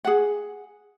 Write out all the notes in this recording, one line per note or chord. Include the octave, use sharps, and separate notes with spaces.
G#4 F#5